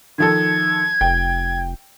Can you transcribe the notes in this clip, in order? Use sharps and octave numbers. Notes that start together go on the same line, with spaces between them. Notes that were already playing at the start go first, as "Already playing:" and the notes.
D#3 F3 A4 G#6
F1 G5